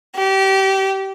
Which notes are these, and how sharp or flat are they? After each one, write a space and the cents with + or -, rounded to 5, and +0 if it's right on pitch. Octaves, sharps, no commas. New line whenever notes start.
G4 -25